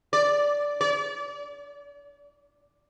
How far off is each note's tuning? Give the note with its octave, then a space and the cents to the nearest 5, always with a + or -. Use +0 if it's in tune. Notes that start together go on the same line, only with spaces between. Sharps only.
D5 -10
D5 -40